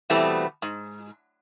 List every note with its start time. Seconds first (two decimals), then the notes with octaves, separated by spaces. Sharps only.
0.10 B2 E3 G3 A3 B3 C4
0.62 G#2